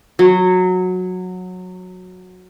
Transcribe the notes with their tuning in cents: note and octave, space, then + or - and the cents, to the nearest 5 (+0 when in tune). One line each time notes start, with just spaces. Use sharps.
F#3 -15